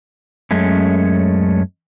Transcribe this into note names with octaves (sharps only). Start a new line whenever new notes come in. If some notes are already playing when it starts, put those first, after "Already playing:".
F#2 G#3 A3 C#4